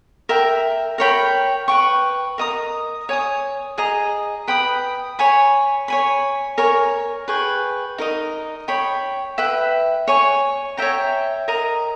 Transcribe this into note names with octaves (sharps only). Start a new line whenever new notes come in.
A#4 E5 G5
A#4 C#5 G5 B5
B4 G5 C#6
A#4 D#5 A#5 D#6
C#5 G#5 D#6
G#4 D#5 A#5 D#6
B4 G5 B5 D#6
C#5 G#5 B5
C#5 G#5 B5
A#4 C#5 G#5
G#4 B4 G5 C#6
D#4 A#4 D#5
C#5 G5 B5
B4 E5 G5
C#5 G#5 C#6
C#5 E5 G5 A#5
A#4 D#5 A#5 D#6